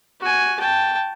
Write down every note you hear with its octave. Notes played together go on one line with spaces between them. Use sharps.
F#4 G#5
G5 A5